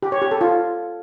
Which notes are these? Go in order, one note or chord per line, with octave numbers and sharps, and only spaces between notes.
G4
C#5
G4
A4
F4